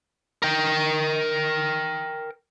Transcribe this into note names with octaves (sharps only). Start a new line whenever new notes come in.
A#4 G5